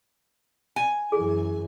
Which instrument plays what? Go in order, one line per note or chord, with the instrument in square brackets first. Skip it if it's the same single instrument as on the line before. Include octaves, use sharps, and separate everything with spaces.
[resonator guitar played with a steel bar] G#5
[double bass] F#2 E3 [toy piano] G#4